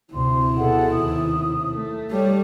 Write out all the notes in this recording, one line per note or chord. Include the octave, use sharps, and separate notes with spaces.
D2 C3 E4 C6
B2 G#4 A4 F#5
D#2 C3 D#6
A3
G3 G4 A4 C#5